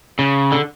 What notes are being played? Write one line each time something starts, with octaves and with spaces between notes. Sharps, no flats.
C#3
D3